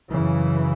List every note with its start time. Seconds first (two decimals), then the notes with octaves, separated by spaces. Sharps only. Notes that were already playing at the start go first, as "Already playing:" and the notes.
0.10 F#2 C#3 E3